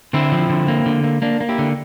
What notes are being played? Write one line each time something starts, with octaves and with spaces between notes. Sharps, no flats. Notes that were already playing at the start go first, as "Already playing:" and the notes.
D3 C4 E4
F3
D3
A#3
D3
A#3
A#3 D4
A#3
E4 G4
D3